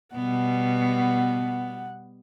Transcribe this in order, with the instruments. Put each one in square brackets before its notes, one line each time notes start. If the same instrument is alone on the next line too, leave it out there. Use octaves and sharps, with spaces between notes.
[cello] B2 [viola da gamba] G3 B3 [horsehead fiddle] F#5